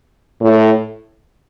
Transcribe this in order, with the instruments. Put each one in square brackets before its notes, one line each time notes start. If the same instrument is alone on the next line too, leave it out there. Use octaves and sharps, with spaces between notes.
[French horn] A2